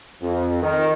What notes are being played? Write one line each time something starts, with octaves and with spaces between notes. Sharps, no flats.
F2
D#3